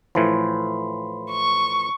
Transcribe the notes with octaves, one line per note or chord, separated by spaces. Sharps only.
A2 E3 F3 B5 C6
C#6